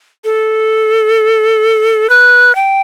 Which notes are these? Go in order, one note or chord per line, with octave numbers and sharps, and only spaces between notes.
A4
B4
G5